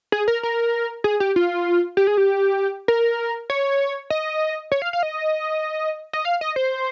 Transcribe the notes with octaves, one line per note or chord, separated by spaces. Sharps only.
G#4
A#4
A#4
G#4
G4
F4
G4
G#4
G4
A#4
C#5
D#5
C#5
F5
F5
D#5
D#5
F5
D#5
C5